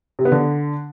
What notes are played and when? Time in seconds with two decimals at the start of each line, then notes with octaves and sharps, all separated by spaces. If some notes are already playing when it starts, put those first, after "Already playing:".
0.19 C3
0.25 B3
0.32 D3